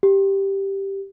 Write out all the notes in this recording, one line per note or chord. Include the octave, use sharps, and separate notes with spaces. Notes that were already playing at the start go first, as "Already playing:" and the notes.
G4